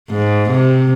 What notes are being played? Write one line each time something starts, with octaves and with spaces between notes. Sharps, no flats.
G#2
C3